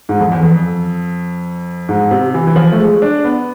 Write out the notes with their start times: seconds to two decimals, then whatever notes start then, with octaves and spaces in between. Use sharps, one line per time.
0.09 G#2
0.20 F2
0.32 E2
0.43 F2
1.89 G#2
2.11 C3
2.34 E3
2.47 E3
2.56 F3
2.72 A3
2.79 G#3
3.02 D4
3.24 B3